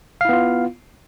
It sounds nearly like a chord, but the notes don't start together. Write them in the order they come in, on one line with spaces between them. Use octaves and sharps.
F5 E4 B3 F4